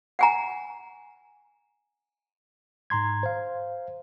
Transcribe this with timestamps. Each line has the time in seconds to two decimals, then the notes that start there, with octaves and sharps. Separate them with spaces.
0.19 F#5 G#5 A#5
2.90 G#2 A#5 C6 G#6
3.23 C5 F5